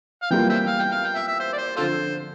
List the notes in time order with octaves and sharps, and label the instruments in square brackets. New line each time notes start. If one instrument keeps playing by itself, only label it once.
[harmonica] F5
[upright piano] E3 G3 A#3 F4 [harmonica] G5
[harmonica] C5 E5 G5
F5
G5
F5
G5
E5
E5
C5
D5
C5
[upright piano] D3 F3 [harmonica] F4 A4 C5